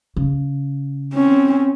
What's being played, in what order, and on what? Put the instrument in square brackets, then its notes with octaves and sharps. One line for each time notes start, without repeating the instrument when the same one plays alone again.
[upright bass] C#3
[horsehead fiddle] C4 C#4